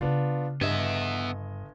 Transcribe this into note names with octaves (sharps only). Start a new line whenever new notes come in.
C#3 B3 D4 D#4 F4
G1 G2 B3 D#5 E5 G#6